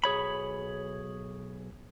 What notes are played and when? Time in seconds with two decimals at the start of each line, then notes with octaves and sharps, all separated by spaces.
0.04 B1 G#4 C#5 B5